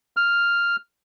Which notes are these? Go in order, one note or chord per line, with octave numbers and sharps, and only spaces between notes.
F6